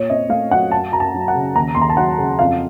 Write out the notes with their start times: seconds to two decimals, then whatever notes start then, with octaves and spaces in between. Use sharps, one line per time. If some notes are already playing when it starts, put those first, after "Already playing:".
Already playing: A#2 C#5
0.10 C4 D#5
0.29 A3 F5
0.51 F#3 F#5
0.72 F#2 A5
0.92 F#2 A#5
1.00 A5
1.14 F#3
1.28 F#5
1.35 C#3
1.56 D#2 A#5
1.75 D#2 C6
1.81 A#5
1.90 A5
1.97 F#3 F#5
2.18 C#3
2.39 F2 F5